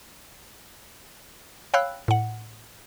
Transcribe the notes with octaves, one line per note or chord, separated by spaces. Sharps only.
C#5 F5 G5 B5 E6 F#6
A2 F#5